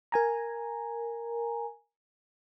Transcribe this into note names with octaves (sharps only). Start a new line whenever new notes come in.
A#4 G#5 A#5